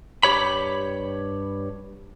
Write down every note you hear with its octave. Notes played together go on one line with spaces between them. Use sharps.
G2 G4 C#5 B5